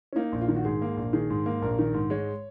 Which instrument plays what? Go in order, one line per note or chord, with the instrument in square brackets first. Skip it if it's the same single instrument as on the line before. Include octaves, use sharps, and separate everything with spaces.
[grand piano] C#4
A#3 D#4
A#1
F4
D#3
F#4
G#2 G#4
A#3
A#1
D#3 G#4
G#2
A#3
A#1 A#4
D#3
G#2
G#3 C#5